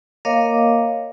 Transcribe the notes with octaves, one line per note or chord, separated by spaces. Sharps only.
A#3 A#4 C#5 D#5 F5 D6